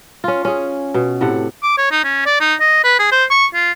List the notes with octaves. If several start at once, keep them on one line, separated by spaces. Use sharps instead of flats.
C#4 F4
C#4 G#4
B2
A2 C3 A4 F#5
D6
C#5
D#4
C#4
D5
D#4
D#5
B4
G#4
C5
C#6
F4